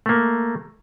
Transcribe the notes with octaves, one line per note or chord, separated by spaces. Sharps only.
A3 A#3